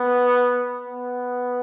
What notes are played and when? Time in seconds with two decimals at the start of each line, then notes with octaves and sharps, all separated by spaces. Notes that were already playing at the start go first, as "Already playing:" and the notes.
Already playing: B3
0.88 B3